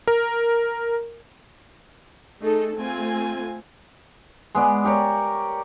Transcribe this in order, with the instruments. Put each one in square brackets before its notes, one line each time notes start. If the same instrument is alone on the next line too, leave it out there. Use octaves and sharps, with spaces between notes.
[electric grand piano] A#4
[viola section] A3 D#4 G#4 A4
A3 C4 F4 G#5
[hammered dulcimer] G#3 B3 D5
G4 A#4 C#5 D5